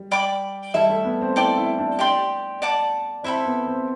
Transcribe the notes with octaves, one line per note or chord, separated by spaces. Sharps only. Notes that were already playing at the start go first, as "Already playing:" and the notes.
Already playing: G3
D5 G5 B5 D6
G3 E4 A4 E5
A3
B3
C4
E4 A4 D5 G5 D6
E4
D4
G4 D5 G5 C6
D5 F#5 A5 D6
C4 E4 A4 E5 B5
B3
C4